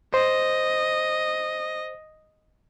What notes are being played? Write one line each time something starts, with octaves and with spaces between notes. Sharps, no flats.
C5 D#5